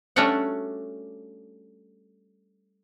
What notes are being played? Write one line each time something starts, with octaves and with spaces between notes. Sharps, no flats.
G3 A3 C#4 D4 F#4 F#5